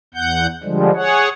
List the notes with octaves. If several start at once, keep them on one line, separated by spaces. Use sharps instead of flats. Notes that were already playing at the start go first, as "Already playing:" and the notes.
E2 F#5 G6
D3 F3 G3 G#3
G#4 C#5 F#5